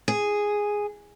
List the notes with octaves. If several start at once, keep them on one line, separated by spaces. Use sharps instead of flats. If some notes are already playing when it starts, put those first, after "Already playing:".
G#4